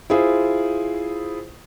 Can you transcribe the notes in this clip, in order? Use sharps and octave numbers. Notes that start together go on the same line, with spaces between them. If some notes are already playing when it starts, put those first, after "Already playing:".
E4 F4 G#4 C5